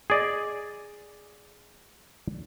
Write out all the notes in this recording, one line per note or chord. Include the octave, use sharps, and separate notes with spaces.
G#4 D5 D#5